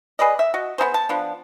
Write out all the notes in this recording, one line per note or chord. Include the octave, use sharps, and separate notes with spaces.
G#4 B4 D5 D#5
E5
F#4 D#5
B3 D#4 G#4 C5
A5
F3 B3 D4